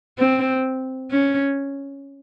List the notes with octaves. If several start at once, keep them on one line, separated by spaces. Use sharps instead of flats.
C4
C#4